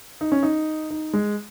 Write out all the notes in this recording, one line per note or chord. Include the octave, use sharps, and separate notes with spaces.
D#4
C#4
D#4
D#4
G#3